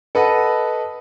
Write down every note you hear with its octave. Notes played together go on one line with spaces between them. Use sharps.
A4 B4 D#5 F#5